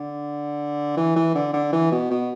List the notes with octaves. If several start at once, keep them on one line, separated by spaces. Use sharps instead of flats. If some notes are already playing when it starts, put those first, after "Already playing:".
Already playing: D3
E3
E3
D3
D3
E3
B2
B2